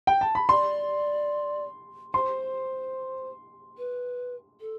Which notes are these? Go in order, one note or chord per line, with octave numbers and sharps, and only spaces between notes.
G5
A5
B5
D5 C6
C5 C6
B4
A4